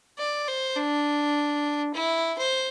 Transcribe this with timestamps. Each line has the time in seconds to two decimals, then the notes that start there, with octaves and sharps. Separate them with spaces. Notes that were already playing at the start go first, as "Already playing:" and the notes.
0.18 D5
0.48 C5
0.77 D4
1.94 E4
2.38 C5